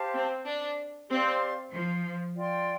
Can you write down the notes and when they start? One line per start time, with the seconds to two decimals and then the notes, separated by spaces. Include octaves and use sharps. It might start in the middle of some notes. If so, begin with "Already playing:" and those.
Already playing: G4 C5 F5 A5
0.14 C4
0.46 D4
1.09 C4 G4 D5 F5 C6
1.72 F3
2.35 F4 D5 G5 C6